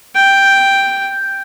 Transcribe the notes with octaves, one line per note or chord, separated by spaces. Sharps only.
G5